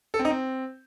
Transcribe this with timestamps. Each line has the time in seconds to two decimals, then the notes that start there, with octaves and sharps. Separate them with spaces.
0.14 A4
0.19 C4
0.25 D#4
0.30 C4